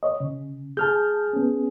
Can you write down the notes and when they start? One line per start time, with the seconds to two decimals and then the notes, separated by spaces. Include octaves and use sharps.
0.03 C#5 D#5
0.20 C#3
0.77 G#4 A5 F6 G6
1.33 B3 C#4